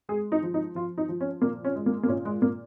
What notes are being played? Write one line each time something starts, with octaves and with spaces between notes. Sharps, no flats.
G#3 G#4
D#4
F3
D#4
F3 F4
D#4
F3
C#4
A#2 A#3
C#4
G#3
A#3
A#3
A#2 C#4
G#3
A#2 A#3